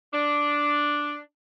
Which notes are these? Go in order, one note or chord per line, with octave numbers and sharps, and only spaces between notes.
D4